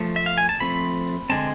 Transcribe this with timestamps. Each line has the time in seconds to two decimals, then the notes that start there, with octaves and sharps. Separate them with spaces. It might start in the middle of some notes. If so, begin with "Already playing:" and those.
Already playing: F3 A3
0.16 E5
0.26 F5
0.38 G#5
0.49 A5
0.60 F3 A3 C4 B5
1.30 D3 G#3 C4 A5